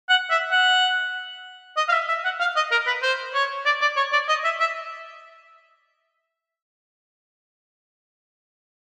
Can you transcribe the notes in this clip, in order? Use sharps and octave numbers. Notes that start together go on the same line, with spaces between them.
F#5
E5
F#5
D#5
F5
E5
E5
F#5
F5
D#5
A#4
B4
C5
C#5
D5
D5
C#5
D5
D#5
E5
E5